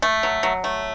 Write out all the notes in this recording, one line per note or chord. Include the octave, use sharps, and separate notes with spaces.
A3
F#3
F#3
A3